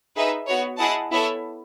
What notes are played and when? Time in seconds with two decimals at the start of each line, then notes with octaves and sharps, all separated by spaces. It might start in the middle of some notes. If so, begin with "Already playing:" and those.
0.15 D#4 G#4 B4 E5
0.47 B3 F#4 C#5
0.79 E4 G#4 D#5 F#5 A5
1.11 B3 E4 A4 C#5 E5